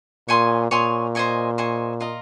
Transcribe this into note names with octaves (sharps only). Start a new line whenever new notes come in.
A#2 C#5 G#5 C6 D#6
A#2 C#5 G#5 C6 D#6
C5 D#5 G#5 C#6
C5 D#5 G#5 C#6
F4 A#4 D#5